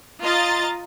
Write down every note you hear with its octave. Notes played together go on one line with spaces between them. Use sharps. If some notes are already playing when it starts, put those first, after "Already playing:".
F4 D#5 A#5 A6